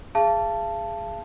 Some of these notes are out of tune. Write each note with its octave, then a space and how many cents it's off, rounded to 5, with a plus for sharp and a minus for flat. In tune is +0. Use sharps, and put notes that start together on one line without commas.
G#4 -5 F5 -35 A5 +0